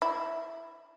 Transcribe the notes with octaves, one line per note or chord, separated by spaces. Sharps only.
E4